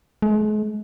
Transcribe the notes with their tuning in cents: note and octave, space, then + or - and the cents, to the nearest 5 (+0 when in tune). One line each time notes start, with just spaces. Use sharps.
G#3 +40